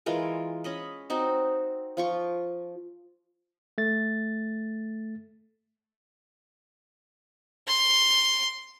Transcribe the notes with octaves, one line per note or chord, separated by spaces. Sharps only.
E3 G#3 F4 A#4
C#4 D#5 B5
C4 D#4 F#4
F3 F4 C#6
A3 A6
C6